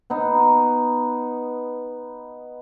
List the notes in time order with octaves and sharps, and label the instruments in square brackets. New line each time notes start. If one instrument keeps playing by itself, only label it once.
[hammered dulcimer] B3 D#4